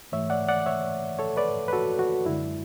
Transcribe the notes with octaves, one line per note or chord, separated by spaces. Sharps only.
G#2 E3 A3 C#5 E5
D5 F#5
D5 F#5
C#5 E5
A4 C#5
B4 D5
B4
F#4 A4
F#4
F#2 D3 G#3 E4